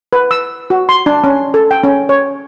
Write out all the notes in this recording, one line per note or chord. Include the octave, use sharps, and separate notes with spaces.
B4
E6
F#4
C6
D4
C#4
A4
G5
C#4
C#5